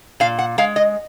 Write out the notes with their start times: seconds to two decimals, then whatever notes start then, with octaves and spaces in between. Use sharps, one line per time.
0.20 A#2 F5
0.39 F#5
0.58 G#3 F5
0.76 D#5